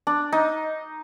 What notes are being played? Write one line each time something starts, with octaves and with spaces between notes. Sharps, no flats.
D4
D#4